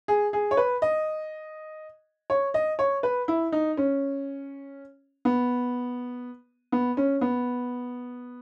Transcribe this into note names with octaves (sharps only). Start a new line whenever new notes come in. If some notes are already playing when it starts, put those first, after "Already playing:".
G#4
G#4
C#5
B4
D#5
C#5
D#5
C#5
B4
E4
D#4
C#4
B3
B3
C#4
B3